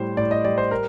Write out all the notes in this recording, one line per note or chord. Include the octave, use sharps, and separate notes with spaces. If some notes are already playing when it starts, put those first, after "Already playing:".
Already playing: A2 G3 C5
A2 D5
D#5
G3 D5
C5
A#4